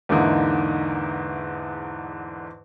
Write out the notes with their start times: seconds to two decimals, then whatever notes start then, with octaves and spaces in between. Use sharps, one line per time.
0.09 E2 G#2 D3 A#3 D#4 E4